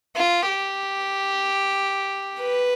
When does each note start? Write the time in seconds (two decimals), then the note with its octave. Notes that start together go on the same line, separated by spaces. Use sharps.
0.16 F4
0.49 G4
2.41 B4